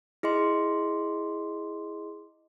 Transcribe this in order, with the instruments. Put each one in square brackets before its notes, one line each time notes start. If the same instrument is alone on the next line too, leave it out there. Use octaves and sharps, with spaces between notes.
[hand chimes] E4 G#4 D#5 C6